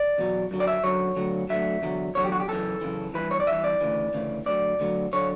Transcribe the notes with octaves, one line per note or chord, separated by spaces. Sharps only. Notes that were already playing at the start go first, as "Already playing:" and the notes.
Already playing: D5
E2 B2 F#3
F#2 D3 F#3
D5
E5
F#2 D3 F#3 C#5
D2 D3 F#3
D2 D3 F#3 E5
E2 D3 F#3
E2 D3 F#3 C#5
G4
F#4
G4
F#2 C#3 E3 A4
F#2 C#3 E3
G2 E3 B4
C#5
D5
G2 E3 E5
D5
D2 C#3 E3
D2 C#3 E3
D2 D3 F#3 D5
D2 D3 F#3
D3 F#3 C#5